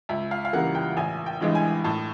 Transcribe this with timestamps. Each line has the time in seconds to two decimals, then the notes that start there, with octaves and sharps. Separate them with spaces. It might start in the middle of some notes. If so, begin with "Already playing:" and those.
0.09 C#2 E5
0.31 F5
0.45 F5
0.53 C#3 E3 G3 A#3 F#5
0.75 G5
0.97 A1 G#5
1.26 G5
1.40 G2 E3 G#3
1.55 G#5
1.84 A2 A5